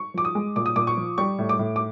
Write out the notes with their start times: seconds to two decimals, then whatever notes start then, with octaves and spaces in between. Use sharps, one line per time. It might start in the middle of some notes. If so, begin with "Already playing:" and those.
Already playing: C#6
0.14 F3 D6
0.25 D#6
0.35 G#3
0.56 A#2 D6
0.66 D#6
0.76 A#2 D6
0.87 C#6
0.97 F3
1.18 G3 C#6
1.39 A2
1.49 D6
1.59 A2
1.76 D6